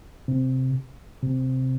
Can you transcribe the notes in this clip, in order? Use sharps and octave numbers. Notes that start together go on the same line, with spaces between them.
C3
C3